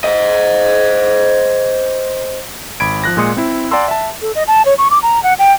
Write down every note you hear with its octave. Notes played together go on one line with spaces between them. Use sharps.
C5 D#5
G#1 B5 G#6 D7
F3 F#6 A#6
A#2 G#3 C6 D#6 C#7
C4 E4
D5 F#5 G#5 A#5 C6 E6
E5 A5
A4
D#5
A5
C#5
C#6
D6
A#5
F#5
G5